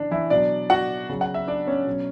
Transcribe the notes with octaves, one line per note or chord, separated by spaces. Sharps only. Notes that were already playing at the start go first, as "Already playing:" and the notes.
Already playing: C#3 E3 D4
E3 E4
B2 F#3 D4 D5
F#4 F#5
C#3 F#3
F#5
E5
D4 D5
C#4 C#5
B2 F#3